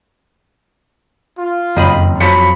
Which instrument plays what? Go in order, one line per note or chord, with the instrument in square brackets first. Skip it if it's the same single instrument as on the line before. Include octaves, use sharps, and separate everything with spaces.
[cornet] F4
[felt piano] F#1 [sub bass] F2 [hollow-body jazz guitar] D#3 D#5 B5
[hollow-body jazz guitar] F3 F#3 [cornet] B5 [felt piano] B6 C#7